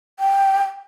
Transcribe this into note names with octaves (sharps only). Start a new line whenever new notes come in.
G5